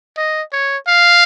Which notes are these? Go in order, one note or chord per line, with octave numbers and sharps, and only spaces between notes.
D#5
C#5
F5